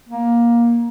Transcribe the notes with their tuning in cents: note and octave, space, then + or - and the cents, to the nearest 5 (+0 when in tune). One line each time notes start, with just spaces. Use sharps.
A#3 +15